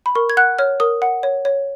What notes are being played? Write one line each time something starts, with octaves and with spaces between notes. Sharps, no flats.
B5
A#4 C#6
G#6
F#5 F#6
C#5 F6
A#4 D#6
F#5
C#5
C#5